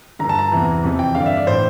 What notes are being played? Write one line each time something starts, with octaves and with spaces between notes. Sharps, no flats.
G2 D3 A#5
A5
A#5
E2 C3 E3
F2 C3 E3
G5
G2 D3 F5
D5
E5
D5
A2 E3 C5